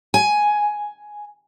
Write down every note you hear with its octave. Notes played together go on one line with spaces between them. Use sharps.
G#5